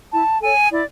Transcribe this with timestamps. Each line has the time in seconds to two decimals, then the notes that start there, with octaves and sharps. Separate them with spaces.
0.12 E4 A5
0.41 A4 C#5 G#5
0.70 E4 D5